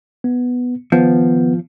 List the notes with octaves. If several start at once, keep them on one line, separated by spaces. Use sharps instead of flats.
B3
D#3 F3 B3